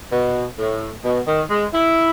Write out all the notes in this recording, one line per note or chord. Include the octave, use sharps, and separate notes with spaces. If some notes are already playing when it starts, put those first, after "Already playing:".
B2
A2
B2
D#3
G#3
E4